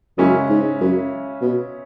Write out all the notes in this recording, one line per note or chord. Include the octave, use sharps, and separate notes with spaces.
F#2 C#3 G#3 C#4 E4
G#2
F#2
B2